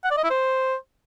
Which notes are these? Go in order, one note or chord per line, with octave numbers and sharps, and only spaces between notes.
F#5
D5
D#5
E4
C5